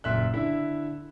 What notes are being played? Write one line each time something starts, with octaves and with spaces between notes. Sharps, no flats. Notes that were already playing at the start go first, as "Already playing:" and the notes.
F#1 A#2 E5 F#6
D3 E4 E5